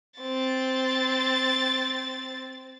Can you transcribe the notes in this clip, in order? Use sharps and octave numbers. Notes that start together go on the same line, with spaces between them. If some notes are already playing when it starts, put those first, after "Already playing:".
C4 A6